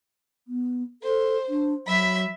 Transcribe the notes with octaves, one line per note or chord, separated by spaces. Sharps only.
B3
A4 C5
D4
F#3 E5 B5